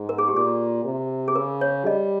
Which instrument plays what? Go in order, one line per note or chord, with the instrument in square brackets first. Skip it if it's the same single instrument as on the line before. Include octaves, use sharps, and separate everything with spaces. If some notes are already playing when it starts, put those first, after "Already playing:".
Already playing: [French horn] G#2
[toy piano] A#4
G#4
G4
[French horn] A#2 [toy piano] G#4
[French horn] C3
[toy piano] G#4
[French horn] C#3 [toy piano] A#4
[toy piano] C#5
[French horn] G3 [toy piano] D#5